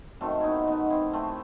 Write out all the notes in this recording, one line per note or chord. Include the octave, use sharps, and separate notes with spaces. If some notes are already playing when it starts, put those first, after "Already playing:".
F#2 D#3 F#3 A3 C4
B3 D#4 E4
B3 D#4
C4 E4
A3 C4